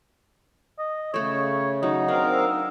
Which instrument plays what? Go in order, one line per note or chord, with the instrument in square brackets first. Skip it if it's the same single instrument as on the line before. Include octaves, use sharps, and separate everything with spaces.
[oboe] D#5
[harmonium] C#3 [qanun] A3 A4 [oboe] C#5
[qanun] F#3 [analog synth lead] D#4 [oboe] D#5
[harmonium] C4 A#4 F5 [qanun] D4
[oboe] E6